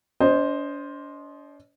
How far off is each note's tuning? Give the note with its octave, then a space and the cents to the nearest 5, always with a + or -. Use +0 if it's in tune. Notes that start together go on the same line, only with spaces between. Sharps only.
D4 -45 C5 +0 D#5 +0